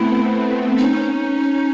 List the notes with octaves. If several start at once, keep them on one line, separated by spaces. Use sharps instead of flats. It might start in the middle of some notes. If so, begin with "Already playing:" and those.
Already playing: A3 B3 C4 E4
B3
C#4 D#4